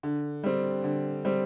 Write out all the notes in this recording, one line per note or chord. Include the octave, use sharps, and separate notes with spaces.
D3
G3 C4
D3
G3 C4